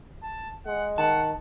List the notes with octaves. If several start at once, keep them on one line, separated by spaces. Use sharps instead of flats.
A5
G#3 F#5
D#3 F#5 A5